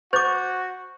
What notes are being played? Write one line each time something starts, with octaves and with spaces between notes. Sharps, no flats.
F#4 C5 C#6 D6 G6 A6